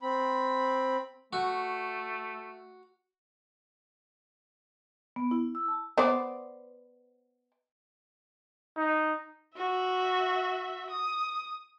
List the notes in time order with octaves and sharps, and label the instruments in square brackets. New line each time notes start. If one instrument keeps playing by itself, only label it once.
[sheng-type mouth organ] C4 B5
[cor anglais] A3 [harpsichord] F#4
[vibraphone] B3
E4
E6
A5
[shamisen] B3 C5 D5
[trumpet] D#4
[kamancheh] F#4 E5
D#6